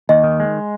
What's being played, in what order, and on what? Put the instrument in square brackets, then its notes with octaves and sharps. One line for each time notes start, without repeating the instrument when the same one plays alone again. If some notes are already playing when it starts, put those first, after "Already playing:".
[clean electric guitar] D#2 [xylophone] D#5
[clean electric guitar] D#3
G#3